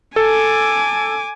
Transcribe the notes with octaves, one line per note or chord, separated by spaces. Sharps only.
A4 G#5 D6